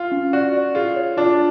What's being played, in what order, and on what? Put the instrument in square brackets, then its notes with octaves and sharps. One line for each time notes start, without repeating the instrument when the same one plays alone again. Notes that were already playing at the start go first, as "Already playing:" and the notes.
Already playing: [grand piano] F4
[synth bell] C#4
[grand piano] F#4 [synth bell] D5
[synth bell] D5
[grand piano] F4 [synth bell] G#4
[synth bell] C#5
[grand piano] D4 [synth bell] F4